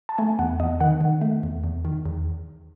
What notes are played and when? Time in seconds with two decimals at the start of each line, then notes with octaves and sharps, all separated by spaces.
0.09 A5
0.18 A3 G#5
0.39 E2 F#5
0.60 E2 D#5
0.81 D#3 F#5
1.01 D#3
1.21 A3
1.43 E2
1.64 E2
1.85 D#3
2.06 E2